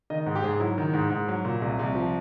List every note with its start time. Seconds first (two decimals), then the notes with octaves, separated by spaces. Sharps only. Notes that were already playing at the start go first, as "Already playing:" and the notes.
0.10 D#3 D#5
0.26 G#2
0.35 G4
0.44 G#2 G#4
0.60 F#3 E4
0.78 D#3
0.94 G#2
1.10 G#2
1.28 F#3
1.45 A#2
1.61 C2
1.79 C2
1.95 F3